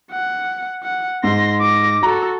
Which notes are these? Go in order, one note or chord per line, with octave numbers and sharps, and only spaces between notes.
F#5
F#5
G#2 C6 A#6
D6 A#6
F#4 A4 A#5